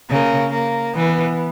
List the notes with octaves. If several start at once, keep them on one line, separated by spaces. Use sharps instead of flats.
C#3 A#3
A#3
E3 B3